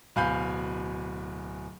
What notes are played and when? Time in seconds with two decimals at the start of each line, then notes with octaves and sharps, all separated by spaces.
0.16 D1 B2 F5 G#5 B5 G6